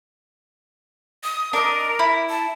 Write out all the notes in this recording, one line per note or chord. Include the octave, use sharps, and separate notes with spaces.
D#6
D4 A#4 D#5
E4
A5